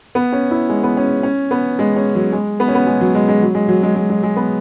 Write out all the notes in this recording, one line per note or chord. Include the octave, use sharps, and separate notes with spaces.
B3
C#4
E4
G#3
B3
C#4
C#4
B3
G#3
C#4
F#3
G#3
B3
C#4
B3
G#3
F#3
G#3
G#3
F#3
G#3
F#3
G#3
G#3
G#3
G#3
B3